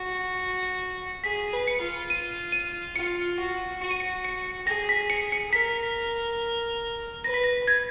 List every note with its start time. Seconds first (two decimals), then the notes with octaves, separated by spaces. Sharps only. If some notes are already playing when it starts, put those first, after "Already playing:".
Already playing: F#4
1.24 G#4 B6
1.53 B4
1.68 C#7
1.81 F4
2.10 D#7
2.52 D#7
2.96 F4 C#7
3.39 F#4
3.82 F#4 C#7
3.91 D#7
4.00 C#7
4.24 C#7
4.67 G#4 A#6
4.89 B6
5.10 C#7
5.32 C#7
5.53 A#4 B6
7.24 B4 A#6
7.34 B6
7.44 A#6
7.68 G#6